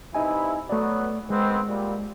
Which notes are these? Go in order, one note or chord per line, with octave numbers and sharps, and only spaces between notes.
G2 C3 D#4 E4 D#5 G#5
F#3 A3 B3 D5
D#3 G#3 B3 C4
A#2 G3